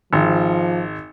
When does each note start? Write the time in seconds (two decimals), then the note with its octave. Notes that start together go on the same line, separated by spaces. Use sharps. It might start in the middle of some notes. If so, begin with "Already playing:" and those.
0.13 G#1 F3